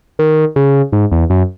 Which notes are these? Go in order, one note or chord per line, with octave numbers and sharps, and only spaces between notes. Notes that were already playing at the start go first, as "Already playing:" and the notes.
D#3
C#3
G#2
E2
F#2